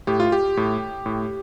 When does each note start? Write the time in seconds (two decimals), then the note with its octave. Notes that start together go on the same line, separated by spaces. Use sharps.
0.07 A2 G4
0.20 F4
0.32 G4
0.57 A2
1.06 A2